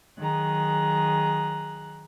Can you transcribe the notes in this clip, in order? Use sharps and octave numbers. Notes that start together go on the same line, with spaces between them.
D#3 F#3 G#4 A#5 F#6